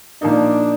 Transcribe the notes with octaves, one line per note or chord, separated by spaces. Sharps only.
A#2 F3 A#3 D4 D#4